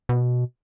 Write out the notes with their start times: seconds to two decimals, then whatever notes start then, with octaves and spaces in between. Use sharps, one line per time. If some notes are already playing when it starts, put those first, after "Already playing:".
0.09 B2